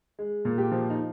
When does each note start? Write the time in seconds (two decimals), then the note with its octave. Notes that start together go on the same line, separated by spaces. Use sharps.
0.19 G#3
0.45 A#2
0.58 G4
0.72 F3
0.90 D#4